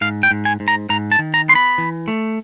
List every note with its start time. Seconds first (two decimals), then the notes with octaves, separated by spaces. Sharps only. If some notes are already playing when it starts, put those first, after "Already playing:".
0.01 G#2 F5
0.23 G5
0.31 G#2
0.45 G#5
0.60 G#2
0.68 A#5
0.90 G#2 A#5
1.12 A5
1.19 D#3
1.34 A#5
1.48 B3 C6
1.55 B5
1.78 E3
2.08 A3